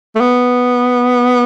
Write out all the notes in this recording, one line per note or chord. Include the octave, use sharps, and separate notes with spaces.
A3
B3